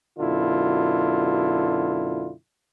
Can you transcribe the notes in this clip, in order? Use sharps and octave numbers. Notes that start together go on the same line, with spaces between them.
F#2 B2 D3 E4 F4